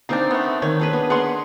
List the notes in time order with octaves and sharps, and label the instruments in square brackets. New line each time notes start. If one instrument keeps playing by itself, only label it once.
[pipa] A#3 D4 [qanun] C4 D#4 A#4
[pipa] A3 B3
[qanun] D#3 [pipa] C#5
[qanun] D4 G#4 B4
B3 G#5
[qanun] G#4 A#4 D5 [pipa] F#5 C6